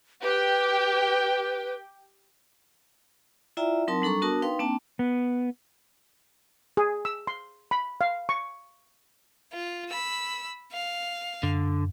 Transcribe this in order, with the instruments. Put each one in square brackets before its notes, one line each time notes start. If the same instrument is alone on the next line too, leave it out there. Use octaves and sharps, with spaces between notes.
[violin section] G4 G5 [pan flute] B4
[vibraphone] E4 F4 D5 E5 G5 A#5
F#3 C4 D#4 A#4 A5 C6
G3 D4 A4 A#5 C#6
B3 D4 F#4 A#4 A5 D#6
D#4 B4 F5 G5 C6
A#3 C4 D4 G5 A5
[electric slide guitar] B3
[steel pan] G#4
E6
C6
B5
F5
C#6
[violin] F4
B5 E6
F5
[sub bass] F#2 [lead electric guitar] D3